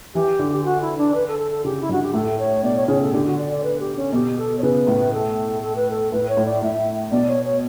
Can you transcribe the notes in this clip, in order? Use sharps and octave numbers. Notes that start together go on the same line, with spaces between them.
E3 G4
D3
G4
F#4
E4
D4
B4
A4
A4
A4
C#3 G4
E4
G2 F#4
G4
A2 A4
C#5
B2 D5
C#5
C#3 C#5
A4
D3 G4
F#4
D5
D5
B4
G4
C#4
B2 G4
A4
C#5
C#3 B4
A2
A4
A4
B4
A4
A2 B4
C#5
A2
D5
A2 E5
B2 D5
C#5
C#5